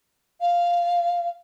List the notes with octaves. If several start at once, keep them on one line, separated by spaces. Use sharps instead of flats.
F5